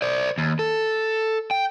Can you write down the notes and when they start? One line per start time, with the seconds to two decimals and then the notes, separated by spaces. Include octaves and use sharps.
0.02 C5 D5
0.38 D#2
0.59 A4
1.51 G5